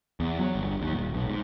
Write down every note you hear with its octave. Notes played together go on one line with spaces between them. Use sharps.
E2
F#3
G1
D#2
D#1
B1
G#2